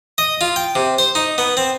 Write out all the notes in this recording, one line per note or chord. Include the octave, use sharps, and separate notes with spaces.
D#5
F4
G5
C3
C5
D#4
B3
C4